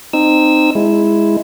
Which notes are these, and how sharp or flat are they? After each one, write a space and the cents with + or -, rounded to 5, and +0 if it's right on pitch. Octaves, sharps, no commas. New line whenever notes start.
C4 -15 D#4 -20 E6 -10
G#3 -5 E4 +0